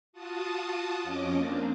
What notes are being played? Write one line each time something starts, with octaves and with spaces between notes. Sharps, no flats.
F4 F#4 A5 D#6
F2 C#4 D#5 D6
A#3 C4 D4